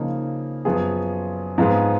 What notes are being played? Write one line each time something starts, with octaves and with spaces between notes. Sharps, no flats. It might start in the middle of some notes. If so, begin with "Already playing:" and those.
Already playing: C#3 F3 A#3 D#4
F#2 F3 B3 F4 G#4
G#2 F3 B3 F4 G#4